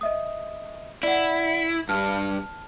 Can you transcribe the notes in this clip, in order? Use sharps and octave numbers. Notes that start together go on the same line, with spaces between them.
D#5 E5 D#6
E4 D5 F#5
G2 A5 F6